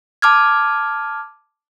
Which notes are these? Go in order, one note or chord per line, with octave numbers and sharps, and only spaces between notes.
A5 D6 F6 G#6